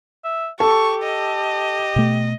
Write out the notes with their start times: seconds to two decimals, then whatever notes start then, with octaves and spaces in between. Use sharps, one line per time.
0.24 E5
0.60 G4 A4 C#6
1.03 D#5
1.96 B2 A3